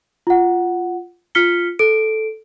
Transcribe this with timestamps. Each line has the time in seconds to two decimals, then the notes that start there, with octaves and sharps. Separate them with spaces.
0.27 F4 F#5
1.35 F4 F6 B6 C#7 G7
1.79 A4 D7